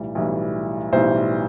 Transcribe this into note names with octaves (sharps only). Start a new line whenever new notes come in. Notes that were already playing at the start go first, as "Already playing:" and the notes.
Already playing: B1 A2 E3 G3
B1 A2 E3 G3
B1 A2 E3 G3 C5